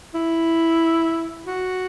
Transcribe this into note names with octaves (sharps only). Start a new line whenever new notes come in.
E4
F#4